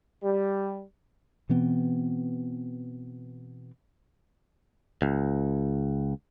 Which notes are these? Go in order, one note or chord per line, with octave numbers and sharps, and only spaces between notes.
G3
B2 E3 B3 C4
C#2